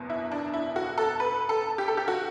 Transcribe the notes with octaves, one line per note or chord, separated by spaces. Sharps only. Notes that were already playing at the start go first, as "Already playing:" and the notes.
Already playing: F#1 E2 B2
E4
D4
E4
F#4
A4
B4
A4
G4
A4
G4
F#4